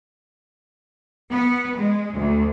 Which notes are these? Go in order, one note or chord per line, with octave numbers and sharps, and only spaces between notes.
B3
G#3
D2